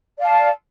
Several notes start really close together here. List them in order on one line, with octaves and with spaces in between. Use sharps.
D5 F5 A5